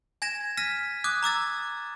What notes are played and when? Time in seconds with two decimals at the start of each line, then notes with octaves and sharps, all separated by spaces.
0.22 G#5 G#6 A#6 E7
0.57 F6 A#6 B6 D#7
1.04 D6 D#6 F#6 G#6
1.23 A#5 D6 E6 A6